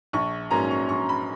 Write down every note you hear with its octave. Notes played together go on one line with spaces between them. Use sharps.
A#1 C#6
G#2 F#3 A#3 C#4 A#5
C#6
A#1 C#6
B5